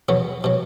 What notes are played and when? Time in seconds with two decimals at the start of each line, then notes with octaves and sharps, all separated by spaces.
0.09 E2 B2 F#3 B3
0.44 B2 F#3